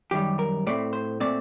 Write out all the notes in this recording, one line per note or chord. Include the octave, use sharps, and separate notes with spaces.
F#2 D#3 G3 G4
A#4
A2 A3 C4 D5
C5
A#2 A3 C4 D5